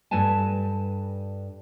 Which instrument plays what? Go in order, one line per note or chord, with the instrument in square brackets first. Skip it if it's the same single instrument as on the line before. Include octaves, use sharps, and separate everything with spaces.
[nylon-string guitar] G2 A4 B4 G#5 A5